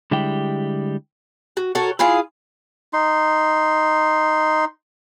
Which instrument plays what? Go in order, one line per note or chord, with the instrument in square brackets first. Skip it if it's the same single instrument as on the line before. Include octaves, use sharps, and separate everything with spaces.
[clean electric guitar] D3 G3 G#3 E4 G4
[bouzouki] F#4
F#4 A4 A#4 C#5
E4 F4 G#4 F5
[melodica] D#4 C6